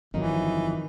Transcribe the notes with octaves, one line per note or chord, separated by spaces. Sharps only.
G1 F2 D#3 E3 F#3 D#4